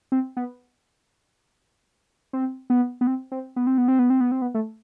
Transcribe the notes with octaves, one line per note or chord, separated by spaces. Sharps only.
C4
B3
C4
B3
B3
C4
C4
B3
C4
B3
C4
B3
C4
B3
C4
B3
A3